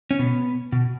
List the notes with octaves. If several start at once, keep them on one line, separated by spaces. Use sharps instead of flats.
C#4
B2 B3
B2